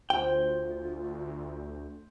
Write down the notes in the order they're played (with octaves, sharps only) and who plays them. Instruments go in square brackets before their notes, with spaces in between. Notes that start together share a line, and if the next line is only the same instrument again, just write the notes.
[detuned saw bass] D2 [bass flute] F4 [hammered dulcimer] C5 [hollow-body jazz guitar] G5